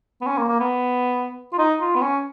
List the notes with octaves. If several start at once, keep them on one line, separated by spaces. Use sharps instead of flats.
B3
C#4
A#3
A#3
B3
F4
D#4
F4
B3
C#4